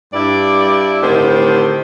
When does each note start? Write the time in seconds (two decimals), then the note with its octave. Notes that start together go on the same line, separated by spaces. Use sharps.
0.14 G2 E4 D5
1.03 A2 D3 D#3 C4 G4 C5